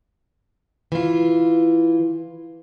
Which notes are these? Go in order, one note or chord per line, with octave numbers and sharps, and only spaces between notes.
E3 F4